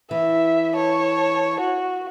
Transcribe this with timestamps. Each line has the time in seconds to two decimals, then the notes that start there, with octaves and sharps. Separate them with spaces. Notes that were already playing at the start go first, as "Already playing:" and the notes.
0.11 E3 E5
0.75 C#5 A5
1.60 F#4